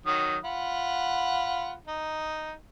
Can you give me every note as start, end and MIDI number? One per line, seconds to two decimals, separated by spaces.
0.06 0.37 51
0.06 0.37 54
0.06 0.37 87
0.45 1.73 65
0.45 1.73 78
0.45 1.73 83
1.87 2.52 63